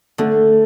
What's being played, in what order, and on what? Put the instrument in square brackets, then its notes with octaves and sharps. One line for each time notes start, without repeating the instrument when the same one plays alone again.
[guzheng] D3 [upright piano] A3